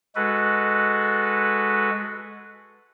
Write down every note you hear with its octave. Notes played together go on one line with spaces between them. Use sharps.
G#3 F#4 A4 B4